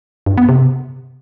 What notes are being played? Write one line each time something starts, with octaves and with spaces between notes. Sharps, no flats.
G2
B3
C3